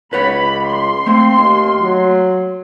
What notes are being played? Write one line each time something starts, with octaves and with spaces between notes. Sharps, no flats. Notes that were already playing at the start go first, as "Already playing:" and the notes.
C#2 B4 C#5 F#5 B5
C6
A3 A#3 C4
D#2
F#3